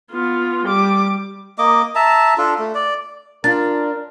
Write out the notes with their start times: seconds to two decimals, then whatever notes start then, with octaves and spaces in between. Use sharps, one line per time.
0.12 B3 F4
0.66 G3 D6
1.58 A#3 D#5 D6
1.95 E5 A5 A#5
2.38 D4 F4 A4
2.59 A3
2.75 D5
3.44 D4 F4 A#4 A6